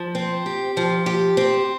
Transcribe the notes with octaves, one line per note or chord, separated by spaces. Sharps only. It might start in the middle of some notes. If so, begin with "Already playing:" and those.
Already playing: F3
C4
G4
F3
G4
C4